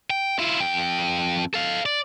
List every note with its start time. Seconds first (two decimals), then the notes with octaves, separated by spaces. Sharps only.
0.10 G5
0.39 E4 F4
0.60 F2 G5
1.54 A4 F5
1.86 D5